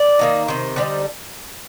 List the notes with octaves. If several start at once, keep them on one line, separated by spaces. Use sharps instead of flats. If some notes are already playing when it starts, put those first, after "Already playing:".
Already playing: D5
D#3 A#3 D#4
C3 D#3 C5
D3 G3 C4 D#4